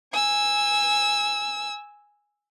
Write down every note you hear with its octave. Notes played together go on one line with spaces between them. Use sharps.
G#5 E6